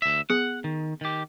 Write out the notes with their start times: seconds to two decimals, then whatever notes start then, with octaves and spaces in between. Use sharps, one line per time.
0.02 D2 E5
0.30 B3 G#4 F#5
0.64 D#3
1.01 D#3 G4